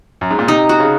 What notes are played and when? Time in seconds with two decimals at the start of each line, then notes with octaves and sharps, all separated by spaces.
0.21 F#2
0.31 G#2
0.39 A#2
0.48 C3 D#4
0.69 F#4
0.80 C#3